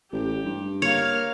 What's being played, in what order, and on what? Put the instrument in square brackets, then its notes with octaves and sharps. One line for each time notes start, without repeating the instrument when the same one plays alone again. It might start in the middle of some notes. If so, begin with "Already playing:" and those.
[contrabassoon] A1 [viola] G4
[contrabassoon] G2
[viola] A#3 F5 [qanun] C#5